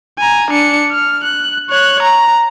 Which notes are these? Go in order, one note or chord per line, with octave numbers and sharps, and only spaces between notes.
G#5 A#5
D4 C#7
F6
F#6
C#5 F#6
A#5